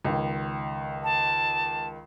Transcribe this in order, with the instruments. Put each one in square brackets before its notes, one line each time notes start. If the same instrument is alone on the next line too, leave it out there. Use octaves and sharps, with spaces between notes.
[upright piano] C#2 D#3
[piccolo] A5